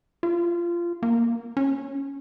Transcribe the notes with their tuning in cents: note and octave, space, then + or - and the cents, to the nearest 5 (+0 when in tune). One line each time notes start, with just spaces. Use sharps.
F4 -20
A#3 +5
C#4 +5